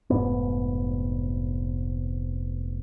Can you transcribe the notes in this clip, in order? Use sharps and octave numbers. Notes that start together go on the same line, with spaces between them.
F1 G#2 B3